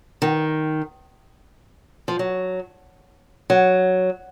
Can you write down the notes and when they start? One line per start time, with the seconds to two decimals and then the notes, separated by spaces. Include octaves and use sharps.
0.22 D#3
2.08 F3
2.19 F#3
3.50 F#3